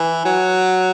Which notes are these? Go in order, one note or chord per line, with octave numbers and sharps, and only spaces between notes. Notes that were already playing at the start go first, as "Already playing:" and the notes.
Already playing: E3
F#3